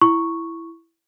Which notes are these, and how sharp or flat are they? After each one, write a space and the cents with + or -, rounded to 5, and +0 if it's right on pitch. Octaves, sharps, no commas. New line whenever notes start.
E4 +10 C#6 +0